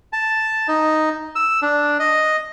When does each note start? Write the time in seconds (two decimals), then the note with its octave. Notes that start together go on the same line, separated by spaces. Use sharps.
0.13 A5
0.68 D#4
1.36 E6
1.62 D4
1.99 D#5